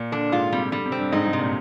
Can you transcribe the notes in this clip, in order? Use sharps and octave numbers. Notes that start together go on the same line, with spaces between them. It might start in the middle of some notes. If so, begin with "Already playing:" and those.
Already playing: A#2
D3 D4
G#2 F4
C3 G3
D3 G3
C3
C4
G2
G#2 D#4
G#2
C3
A#2